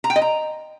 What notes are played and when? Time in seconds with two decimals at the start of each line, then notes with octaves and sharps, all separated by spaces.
0.04 A#5
0.10 G5
0.16 D#5
0.22 A#5